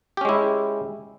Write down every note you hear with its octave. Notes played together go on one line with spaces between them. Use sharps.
G#3 C#4 E4 G4